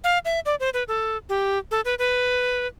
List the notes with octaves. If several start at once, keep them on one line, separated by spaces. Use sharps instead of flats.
F5
E5
D5
C5
B4
A4
G4
A4
B4
B4